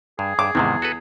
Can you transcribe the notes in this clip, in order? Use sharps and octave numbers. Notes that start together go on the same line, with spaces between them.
G2 G#4
G2 D6
E2 G#2 C3 D#3
F#4 A4 B4